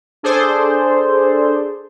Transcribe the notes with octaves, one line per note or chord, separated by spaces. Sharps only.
D4 G#4 A4 C5 D5